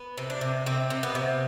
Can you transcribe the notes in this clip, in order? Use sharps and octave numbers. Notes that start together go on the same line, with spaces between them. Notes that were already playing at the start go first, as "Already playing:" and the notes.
Already playing: B3
C3
D4
C3
C3 C4
C3
B3
C3